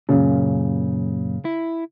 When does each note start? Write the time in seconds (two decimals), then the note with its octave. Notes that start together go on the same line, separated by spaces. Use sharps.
0.09 F#2 A#2 C#3
1.45 E4